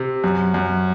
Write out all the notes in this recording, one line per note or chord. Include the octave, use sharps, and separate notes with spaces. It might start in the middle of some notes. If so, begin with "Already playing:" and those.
Already playing: C3
F#2
F#2